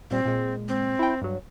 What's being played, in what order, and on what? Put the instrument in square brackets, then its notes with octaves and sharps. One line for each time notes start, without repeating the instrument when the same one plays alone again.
[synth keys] A#2 G3 [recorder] C4
[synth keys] A#2 G#3
[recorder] C4
[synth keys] E4 G5
G2 F#3